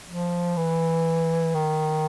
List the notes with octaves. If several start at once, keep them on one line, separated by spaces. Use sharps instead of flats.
F3
E3
D#3